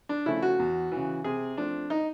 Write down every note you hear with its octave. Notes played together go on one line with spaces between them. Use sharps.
D4
C#3 F3 A3 E4
F#4
E2
C#3 E3
C3 G#4
F3 A3 C4 D4
D#4